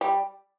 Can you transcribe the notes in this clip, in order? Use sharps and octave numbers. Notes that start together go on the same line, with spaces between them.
G3